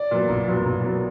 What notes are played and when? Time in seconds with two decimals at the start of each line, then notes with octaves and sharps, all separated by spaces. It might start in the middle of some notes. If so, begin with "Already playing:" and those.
Already playing: D5
0.11 A#2 F#3 B3
0.29 B1
0.48 A#2 F#3 B3
0.66 B1
0.84 A#2 F#3 B3